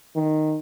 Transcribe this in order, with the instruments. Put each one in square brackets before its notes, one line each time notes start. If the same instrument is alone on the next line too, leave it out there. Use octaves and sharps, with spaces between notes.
[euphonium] D#3